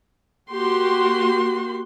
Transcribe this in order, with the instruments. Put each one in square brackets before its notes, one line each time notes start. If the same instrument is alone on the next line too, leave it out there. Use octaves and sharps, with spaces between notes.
[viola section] A#3 F#4 G4 C6